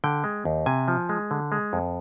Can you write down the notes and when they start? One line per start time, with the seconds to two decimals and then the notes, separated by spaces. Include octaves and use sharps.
0.04 D3 G5
0.24 G#3
0.45 D#2
0.66 C3 G#5
0.88 F3
1.09 G#3
1.31 D3
1.52 G#3
1.73 F2